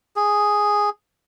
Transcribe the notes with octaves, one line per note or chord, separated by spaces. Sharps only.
G#4